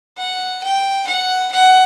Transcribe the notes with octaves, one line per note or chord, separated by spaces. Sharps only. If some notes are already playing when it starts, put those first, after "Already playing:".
F#5
G5
F#5
F#5